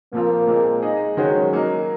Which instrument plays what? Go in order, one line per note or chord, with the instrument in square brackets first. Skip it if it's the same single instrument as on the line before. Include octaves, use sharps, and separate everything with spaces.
[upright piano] A#2 F3 C4 F4 [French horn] A#3
[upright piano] A#2 G#3 C4
G#3 D#4 G#4 D#5
[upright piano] D#3 G#3 C#4 F#4 C5 [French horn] F#3
[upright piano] F#3 A#3 D#4 A#4 D#5